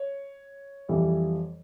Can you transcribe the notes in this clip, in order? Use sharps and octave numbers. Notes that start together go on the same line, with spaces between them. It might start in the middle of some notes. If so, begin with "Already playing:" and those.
Already playing: C#5
F2 E3 G3